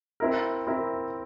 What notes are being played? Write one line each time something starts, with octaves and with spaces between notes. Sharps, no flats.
C4 E4 A#4
C4 E4 A#4